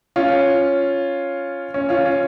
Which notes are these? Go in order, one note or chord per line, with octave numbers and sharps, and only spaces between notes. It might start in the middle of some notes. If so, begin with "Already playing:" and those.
C#4 F4
C#4
C#4 F4
C#4